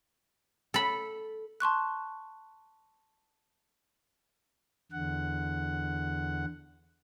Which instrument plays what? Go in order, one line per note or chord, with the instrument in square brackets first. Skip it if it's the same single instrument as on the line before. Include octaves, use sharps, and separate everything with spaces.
[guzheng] A4 B5
[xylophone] A5 C6 C#6 F#6
[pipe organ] E2 D3 F#5